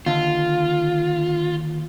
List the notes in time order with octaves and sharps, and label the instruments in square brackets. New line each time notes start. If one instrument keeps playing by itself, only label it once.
[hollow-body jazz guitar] D#2 D3 [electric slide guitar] F4